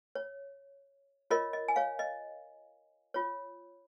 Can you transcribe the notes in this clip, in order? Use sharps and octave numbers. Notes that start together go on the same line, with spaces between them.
C#5
F4 A#4 C#5 D#5
D#5
G#5
C#5 F5
D#5
F4 C#5